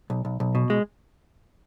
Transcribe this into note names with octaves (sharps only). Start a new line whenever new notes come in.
B1
B1
B1
B2
G#3